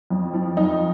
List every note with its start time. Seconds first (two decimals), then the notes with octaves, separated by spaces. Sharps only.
0.10 F2
0.34 F3
0.57 F2 D#4